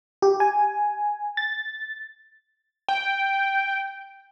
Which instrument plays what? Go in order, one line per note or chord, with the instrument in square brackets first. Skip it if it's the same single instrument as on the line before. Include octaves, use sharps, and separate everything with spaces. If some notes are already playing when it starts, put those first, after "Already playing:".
[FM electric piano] G4
G#5
A6
[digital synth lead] G5